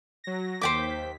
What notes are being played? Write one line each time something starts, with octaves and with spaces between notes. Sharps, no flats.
F#3 A#6
D#2 C5 G5 D6 B6